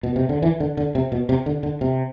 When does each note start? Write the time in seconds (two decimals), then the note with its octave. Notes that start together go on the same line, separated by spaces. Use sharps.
0.03 B2
0.16 C3
0.29 D3
0.42 E3
0.60 D3
0.77 D3
0.95 C3
1.12 B2
1.29 C3
1.46 D3
1.63 D3
1.81 C3